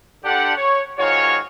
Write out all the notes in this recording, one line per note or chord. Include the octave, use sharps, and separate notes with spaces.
D3 D4 G4 F#5
C#5
G#2 D#3 F4 F#4 C#5